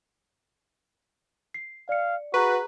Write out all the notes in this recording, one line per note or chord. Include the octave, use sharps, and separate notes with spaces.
C7
D5 F5 C#7
F#4 G#4 B4 A#5 C#6